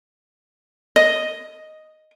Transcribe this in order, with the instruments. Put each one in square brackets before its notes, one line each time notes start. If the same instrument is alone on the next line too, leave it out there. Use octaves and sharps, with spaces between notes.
[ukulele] D#5